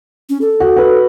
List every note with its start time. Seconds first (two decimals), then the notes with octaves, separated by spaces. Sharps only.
0.29 C#4
0.41 A4
0.60 F#4
0.76 F#4 B4